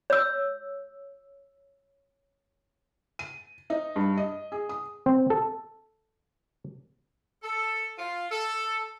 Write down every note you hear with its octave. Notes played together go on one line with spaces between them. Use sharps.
C#5 E6
D#7
D#4
G2
D#5
G#4
D#6
C4
A4
A4
F4
A4